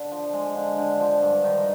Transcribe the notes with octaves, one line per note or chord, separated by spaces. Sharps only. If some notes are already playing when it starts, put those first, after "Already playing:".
Already playing: D3
F3
G#3
D3
D3
F3
G2
D#3